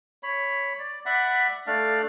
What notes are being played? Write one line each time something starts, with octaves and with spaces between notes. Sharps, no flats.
C#5 B5
D5
D5 E5 F#5 B5
A3 D4 D5 F5